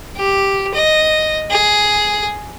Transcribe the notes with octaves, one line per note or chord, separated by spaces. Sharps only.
G4
D#5
G#4